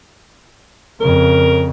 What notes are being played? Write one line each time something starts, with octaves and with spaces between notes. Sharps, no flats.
F2 C#3 A#4